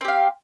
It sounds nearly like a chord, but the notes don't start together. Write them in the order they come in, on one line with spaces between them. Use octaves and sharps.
C4 G4 F5